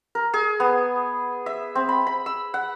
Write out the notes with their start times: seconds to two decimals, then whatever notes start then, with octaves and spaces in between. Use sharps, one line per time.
0.15 A#4
0.34 G#4
0.60 B3
1.46 E5
1.75 C4
1.89 B5
2.07 B5
2.26 E6
2.54 F#5